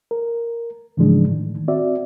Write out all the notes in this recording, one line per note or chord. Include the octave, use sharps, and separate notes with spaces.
A#4
G#2 C#3 E3 F3 G#3 D4
A2 D#3
C4 F#4 D5 E5